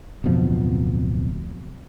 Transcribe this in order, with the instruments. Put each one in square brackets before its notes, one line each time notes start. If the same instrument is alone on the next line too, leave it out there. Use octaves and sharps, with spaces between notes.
[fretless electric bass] D1 F2 B2 F3